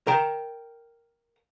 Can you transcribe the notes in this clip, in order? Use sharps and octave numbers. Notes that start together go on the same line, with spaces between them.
A#4 G5